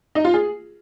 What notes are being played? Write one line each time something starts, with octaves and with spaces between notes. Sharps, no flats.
D#4
F4
G#4